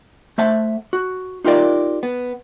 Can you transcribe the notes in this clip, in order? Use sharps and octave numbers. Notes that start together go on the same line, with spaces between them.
A3 C5 E5 F#5 A5
F#4
D#4 F4 G4 A#4 D5
B3